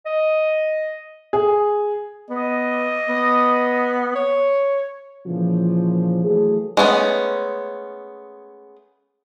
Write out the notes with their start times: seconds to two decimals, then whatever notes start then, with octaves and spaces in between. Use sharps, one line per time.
0.06 D#5
1.33 G#4
2.30 B3 D#5
3.09 B3
4.15 C#5
5.26 A#2 C#3 E3 F3
6.23 E3 F#3 A3 G#4
6.77 G#3 A3 B3 C#4